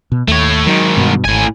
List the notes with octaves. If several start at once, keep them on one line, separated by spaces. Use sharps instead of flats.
B2
D#2 A3 C#5
G#2 D#3 F#3
G2 B2
G#1 A2 G#5